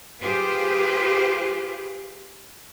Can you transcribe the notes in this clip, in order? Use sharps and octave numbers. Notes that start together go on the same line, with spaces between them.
F4 G4 G#4 B4 C5